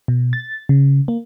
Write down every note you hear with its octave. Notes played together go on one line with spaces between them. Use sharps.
B2
A6
C#3
A#3